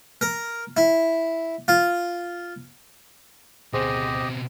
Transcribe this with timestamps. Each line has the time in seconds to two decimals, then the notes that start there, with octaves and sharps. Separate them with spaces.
0.21 A#4
0.77 E4
1.68 F4
3.73 D2 B2 C4 G4 G#4 C5 D#5